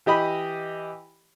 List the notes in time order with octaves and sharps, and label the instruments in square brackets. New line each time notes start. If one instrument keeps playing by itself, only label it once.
[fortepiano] E3 G4 D#5 B5